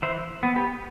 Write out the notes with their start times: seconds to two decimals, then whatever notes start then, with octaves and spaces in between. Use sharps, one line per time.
0.02 E3 C5 E5
0.43 B3
0.56 G4 B4